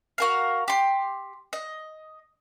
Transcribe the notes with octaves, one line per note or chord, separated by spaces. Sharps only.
F#4 A#4 F5
G4 C6
D#5